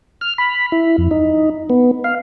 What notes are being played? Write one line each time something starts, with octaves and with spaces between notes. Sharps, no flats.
F6
B5
E4
F2
D#4
B3
F5